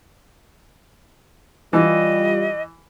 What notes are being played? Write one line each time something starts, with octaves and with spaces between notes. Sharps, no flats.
E3 G3 F4 D#5